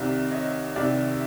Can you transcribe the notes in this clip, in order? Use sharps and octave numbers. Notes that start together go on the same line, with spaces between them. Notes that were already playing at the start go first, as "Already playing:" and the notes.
Already playing: C2 C3 D#3 D5 E5
C#5 D#5
C2 C3 D#3 D5 E5
E5